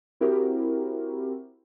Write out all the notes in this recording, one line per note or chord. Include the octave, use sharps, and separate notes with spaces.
C4 E4 F#4 G4 A#4